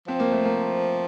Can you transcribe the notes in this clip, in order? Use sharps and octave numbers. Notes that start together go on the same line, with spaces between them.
F3 C4
A#3
A3
A#3